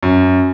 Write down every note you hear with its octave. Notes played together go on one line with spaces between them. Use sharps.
F#2